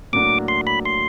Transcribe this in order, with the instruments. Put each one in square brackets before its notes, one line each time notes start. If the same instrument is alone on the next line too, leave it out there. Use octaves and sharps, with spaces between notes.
[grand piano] A2 F#3 A#3 D4 F#4 [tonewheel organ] D6
[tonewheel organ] C6
B5
C6